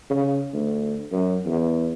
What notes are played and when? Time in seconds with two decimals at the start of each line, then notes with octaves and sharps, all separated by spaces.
0.10 C#3
0.53 D2
1.12 F#2
1.46 E2